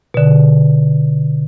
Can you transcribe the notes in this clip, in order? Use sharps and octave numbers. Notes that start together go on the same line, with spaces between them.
B2 D3